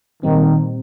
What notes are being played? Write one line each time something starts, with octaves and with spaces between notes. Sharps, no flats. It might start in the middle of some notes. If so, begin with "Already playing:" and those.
A#2 D#3 G3 C4